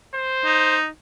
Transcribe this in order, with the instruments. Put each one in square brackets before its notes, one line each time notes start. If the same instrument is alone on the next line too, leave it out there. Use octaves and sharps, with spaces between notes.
[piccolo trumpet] C5
[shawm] D#4